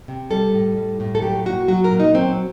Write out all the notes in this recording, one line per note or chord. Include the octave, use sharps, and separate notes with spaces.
C3
G3 A4
A2
G3
A2
A4
F#3 G4
A#2 F#4
F#3 F#4
A#4
A#2
D#4
F#3 C4